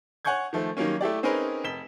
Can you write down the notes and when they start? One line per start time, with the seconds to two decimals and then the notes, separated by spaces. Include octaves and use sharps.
0.25 C#5 F#5 G#5 C#6 G6 G#6
0.53 D#3 F3 A3
0.77 D#3 F#3 G3 A#3 C#4
1.01 A3 E4 G4 D5
1.23 C4 C#4 D#4 G#4 A#4 B4
1.64 F1 B6 E7 G7